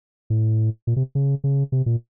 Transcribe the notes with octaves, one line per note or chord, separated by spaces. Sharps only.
A2
A#2
C3
C#3
C#3
C3
A#2